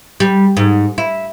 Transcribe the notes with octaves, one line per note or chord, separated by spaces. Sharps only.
G3
G#2
E4